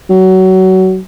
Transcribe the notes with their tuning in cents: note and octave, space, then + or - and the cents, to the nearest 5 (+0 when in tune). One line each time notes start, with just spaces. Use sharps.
F#3 +25